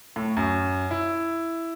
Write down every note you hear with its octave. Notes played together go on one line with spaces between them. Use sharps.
A2
F#2
E4